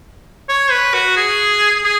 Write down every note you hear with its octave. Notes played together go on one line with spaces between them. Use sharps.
C#5
B4
F#4
G#4
G#4